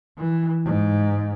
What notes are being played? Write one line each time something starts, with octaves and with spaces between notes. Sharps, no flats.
E3
G#2